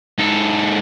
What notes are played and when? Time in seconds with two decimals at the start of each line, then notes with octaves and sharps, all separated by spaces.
0.18 G#2 A4